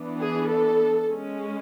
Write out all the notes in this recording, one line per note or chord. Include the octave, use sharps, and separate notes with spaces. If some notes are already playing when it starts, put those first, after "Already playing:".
Already playing: E3 B3 D4
G#4
A4
G#3 C#4